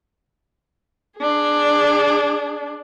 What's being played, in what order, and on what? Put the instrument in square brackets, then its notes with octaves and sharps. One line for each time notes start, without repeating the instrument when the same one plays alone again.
[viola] D4 G#4